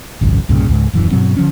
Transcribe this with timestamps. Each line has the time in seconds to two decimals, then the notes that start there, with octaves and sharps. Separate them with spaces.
0.21 G#1 C#2 F#2
0.49 C2 G2 A#2 C#3
0.69 C#2 G#2
0.93 D#1 F#2 E3
1.11 G2 B2 F#3 C4
1.37 D3 F3 C#4